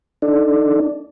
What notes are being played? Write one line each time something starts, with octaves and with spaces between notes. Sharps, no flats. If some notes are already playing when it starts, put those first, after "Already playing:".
D4 D#4 A4 D5